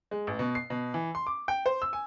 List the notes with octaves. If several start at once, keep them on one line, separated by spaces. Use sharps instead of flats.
G#3
A1
B2
C7
B2
E3
C6
D6
G5
C5
E6
G#5